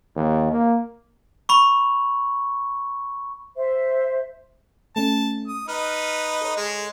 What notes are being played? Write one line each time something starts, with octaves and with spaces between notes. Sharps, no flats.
D#2
A#3
B5 C#6
C5 E5
A3 C#4 A5
D#6
D#4 B4 F6
A4 C#5
G#3